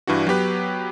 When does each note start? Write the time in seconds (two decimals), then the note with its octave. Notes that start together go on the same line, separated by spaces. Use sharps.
0.07 G2 E3 D4 F#4
0.27 F#3 B3 G4 B4